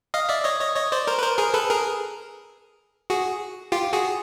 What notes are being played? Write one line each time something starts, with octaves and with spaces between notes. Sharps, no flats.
D#5 F5
D5 E5
C#5 D#5
C#5 D#5
C#5 D#5
C5 D5
A#4 C5
B4
A#4 C5
G#4 A#4
A4 B4
G#4 A#4
F#4 G#4
F4 G4
F#4 G#4